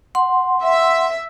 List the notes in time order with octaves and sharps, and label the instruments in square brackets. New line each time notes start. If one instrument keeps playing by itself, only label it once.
[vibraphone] F#5 C6
[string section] E5